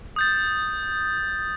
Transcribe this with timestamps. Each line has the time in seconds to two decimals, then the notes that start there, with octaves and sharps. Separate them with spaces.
0.16 D#6 G6 A6